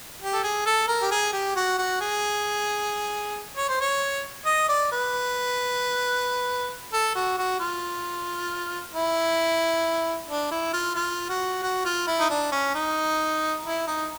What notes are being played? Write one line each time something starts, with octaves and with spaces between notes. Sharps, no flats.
G4
A4
G#4
A4
A#4
G4
G#4
G4
F#4
F#4
G#4
C#5
C5
C#5
D#5
D5
B4
A4
F#4
F#4
F4
E4
D4
E4
F4
F4
F#4
F#4
F4
E4
D#4
D4
C#4
D#4
E4
D#4